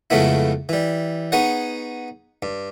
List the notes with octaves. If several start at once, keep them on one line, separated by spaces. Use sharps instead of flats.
F2 C#3 G#3 A3 B3 E4
E3 G3
B3 D#4 G#4 C#5 F#5
G2